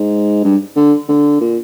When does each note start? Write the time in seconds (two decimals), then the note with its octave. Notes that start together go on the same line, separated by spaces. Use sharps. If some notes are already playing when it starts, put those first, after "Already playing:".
Already playing: G#2
0.44 G2
0.76 D3
1.09 D3
1.41 A#2